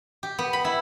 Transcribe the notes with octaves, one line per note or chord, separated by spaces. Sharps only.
G4
B3
B5
E4